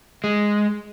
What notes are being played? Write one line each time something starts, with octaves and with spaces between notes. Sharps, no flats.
G#3